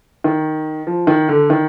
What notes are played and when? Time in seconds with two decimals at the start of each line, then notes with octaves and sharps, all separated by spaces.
0.24 D#3
0.87 F3
1.07 D#3
1.29 D3
1.50 D#3